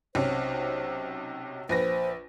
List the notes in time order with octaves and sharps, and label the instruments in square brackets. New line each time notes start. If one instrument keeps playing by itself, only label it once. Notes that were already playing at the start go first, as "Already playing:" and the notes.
[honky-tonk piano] B1 C3 C#4 [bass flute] C5
[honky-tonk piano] A#1 B4 A#6 [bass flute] C5